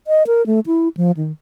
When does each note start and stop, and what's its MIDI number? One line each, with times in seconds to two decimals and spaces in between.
0.07 0.23 75
0.27 0.45 70
0.46 0.60 57
0.66 0.88 64
0.97 1.11 53
1.17 1.32 51